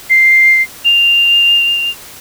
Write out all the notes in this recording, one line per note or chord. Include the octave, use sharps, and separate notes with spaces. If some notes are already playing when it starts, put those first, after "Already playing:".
C7
F7